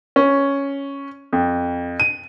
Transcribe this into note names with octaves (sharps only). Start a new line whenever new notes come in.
C#4
F2
D#7